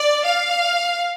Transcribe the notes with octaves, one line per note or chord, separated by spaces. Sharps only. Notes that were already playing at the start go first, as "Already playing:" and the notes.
Already playing: D5
F5